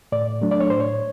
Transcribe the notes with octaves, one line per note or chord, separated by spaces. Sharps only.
A2 D5
F#3 A3 D4
D5
C#5
A2 C5
C#5